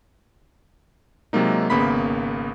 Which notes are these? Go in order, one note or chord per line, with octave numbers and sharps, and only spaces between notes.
C3 F#3 G#3 A#3 D#4
G#1 C#3 A#3 B3 B5 B6